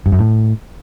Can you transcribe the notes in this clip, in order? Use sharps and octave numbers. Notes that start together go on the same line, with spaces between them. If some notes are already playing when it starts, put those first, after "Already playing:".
G2
F#2
A2